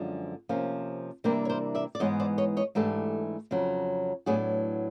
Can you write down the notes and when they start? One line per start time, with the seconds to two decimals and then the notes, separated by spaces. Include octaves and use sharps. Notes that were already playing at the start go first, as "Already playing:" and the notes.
Already playing: F#2 D3 F3 G#3 C4
0.49 C3 F3 A#3 C#4
1.24 C3 E3 G3 A#3 D4 A#4 C5
1.45 C#5
1.49 A#4 C5
1.75 D5 E5
1.95 D5
2.00 G#2 E3 G#3 B3 C#5 D#5
2.20 C5 D5
2.38 C#5 D#5
2.57 C#5 D#5
2.75 G#2 E3 A3 D4 G4 A4
3.51 F2 C#3 F#3
4.26 A2 F#3 B3 D4 F#4 G#4